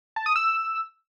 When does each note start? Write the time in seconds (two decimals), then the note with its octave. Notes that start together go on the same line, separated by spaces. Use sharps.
0.16 A5
0.26 D#6
0.36 E6